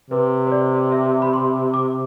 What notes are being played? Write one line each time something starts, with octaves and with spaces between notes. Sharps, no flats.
C3 B4
C5
D5
E5
B5
C6
D6